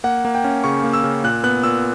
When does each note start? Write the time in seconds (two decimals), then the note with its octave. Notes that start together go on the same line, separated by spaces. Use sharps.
0.04 A#3 F#5
0.25 A#3
0.35 G5
0.44 C#4
0.64 C#3 C#6
0.84 A#3
0.93 E6
1.04 C#3
1.24 A#2 F#6
1.44 B3 F#6
1.63 A#2 E6